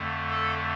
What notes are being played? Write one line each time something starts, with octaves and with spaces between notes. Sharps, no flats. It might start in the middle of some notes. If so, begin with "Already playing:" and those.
Already playing: F2 D3 A3
A4